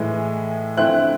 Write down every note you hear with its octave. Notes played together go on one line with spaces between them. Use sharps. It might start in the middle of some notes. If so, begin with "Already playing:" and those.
Already playing: A2 E3 G#3
D3 F3 A3 C4 E4 F#6